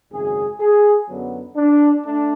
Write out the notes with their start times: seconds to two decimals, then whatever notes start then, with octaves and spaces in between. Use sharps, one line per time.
0.11 G#1 F#2 C#3 G#4
0.60 G#4
1.08 F#2 D3 F#3 B3
1.56 D4
2.04 A3 D4